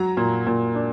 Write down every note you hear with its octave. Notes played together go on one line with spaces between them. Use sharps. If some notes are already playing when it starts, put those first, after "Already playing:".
Already playing: F#3 A#5
A#2
A#2
D4